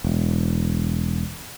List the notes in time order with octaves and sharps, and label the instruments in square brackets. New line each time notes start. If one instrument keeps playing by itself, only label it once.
[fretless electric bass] E1